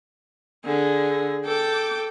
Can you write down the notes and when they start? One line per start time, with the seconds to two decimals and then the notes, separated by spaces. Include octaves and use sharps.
0.65 D3 G#4
1.45 A4 G5 D6